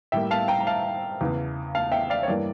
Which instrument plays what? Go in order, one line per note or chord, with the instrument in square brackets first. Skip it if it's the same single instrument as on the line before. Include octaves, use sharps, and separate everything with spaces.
[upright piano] A2 G3 A#3 E5 G5
F5 A5
G5 A#5
A#5
F5 A5
E2 C#3 E3
F5 A5
E5 G5
D5 F5
C#5
G2 E3 A#3 D5